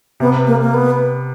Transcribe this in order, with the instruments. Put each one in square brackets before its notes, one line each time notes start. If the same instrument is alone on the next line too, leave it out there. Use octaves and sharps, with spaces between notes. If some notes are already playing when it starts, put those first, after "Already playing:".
[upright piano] C3 [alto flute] B3
[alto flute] A#3
A#3
B3